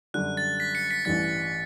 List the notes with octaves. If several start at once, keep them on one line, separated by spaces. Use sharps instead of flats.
F#2 D3 G3 F#6
A6
B6
C#7
B6
A1 G2 E3 G3 A6